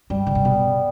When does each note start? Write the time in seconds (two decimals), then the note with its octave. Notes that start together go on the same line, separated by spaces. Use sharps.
0.10 G2 G3
0.27 D3
0.35 C3
0.45 B2 B3